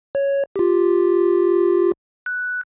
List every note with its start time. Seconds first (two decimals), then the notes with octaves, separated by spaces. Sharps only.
0.15 C#5
0.56 F4 G4
2.26 F#6